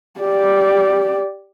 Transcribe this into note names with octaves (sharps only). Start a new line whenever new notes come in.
G4 D5